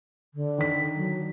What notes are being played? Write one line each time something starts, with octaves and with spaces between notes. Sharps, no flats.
D3
D#3 B6
F#3